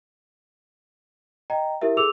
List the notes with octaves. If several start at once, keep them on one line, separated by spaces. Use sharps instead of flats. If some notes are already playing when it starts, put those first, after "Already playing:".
D#5 G5 A#5
E4 G4 A#4 E5
G#4 A4 D6 E6 F7